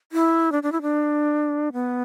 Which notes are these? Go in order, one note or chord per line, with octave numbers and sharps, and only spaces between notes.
E4
D4
D4
E4
D4
B3